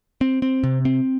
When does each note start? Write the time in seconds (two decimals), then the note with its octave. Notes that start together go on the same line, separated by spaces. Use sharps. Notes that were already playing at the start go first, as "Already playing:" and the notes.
0.21 C4
0.42 C4
0.63 C3
0.85 C4